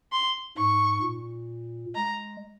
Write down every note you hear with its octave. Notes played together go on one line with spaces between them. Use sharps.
C6
G#2 C#6
A#2
G#3 A#5